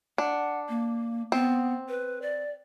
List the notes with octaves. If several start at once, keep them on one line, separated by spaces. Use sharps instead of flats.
D4 F#5
A#3
B3 C4
B4
D5